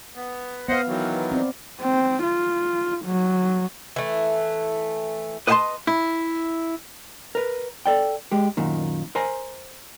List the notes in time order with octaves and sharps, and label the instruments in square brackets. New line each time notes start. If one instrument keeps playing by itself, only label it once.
[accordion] B3
[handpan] B3 F5 [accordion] C5 D#5 F#5
[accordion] D#3 E3 F#3
[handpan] C4 D5
[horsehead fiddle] C4
F4
F#3
[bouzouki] E3 A3
[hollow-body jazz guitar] B4 D#5 F5 G5 A5 C6
E4
A#4 B4
A4 D5 G5
G#3 G4
F#2 A#2 D#3
A#4 C5 G#5 A#5